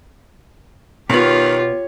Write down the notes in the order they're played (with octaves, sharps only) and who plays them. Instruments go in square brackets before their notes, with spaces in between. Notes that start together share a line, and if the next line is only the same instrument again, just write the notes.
[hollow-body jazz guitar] B2 B3 [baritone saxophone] D#3 [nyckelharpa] F4 G4 [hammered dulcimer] C#5